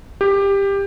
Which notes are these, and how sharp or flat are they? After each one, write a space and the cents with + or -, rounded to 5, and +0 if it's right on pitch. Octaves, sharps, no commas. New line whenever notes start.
G4 +15